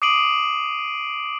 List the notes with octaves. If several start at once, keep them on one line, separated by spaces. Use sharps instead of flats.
D6 D#6 C7 D7 D#7 F#7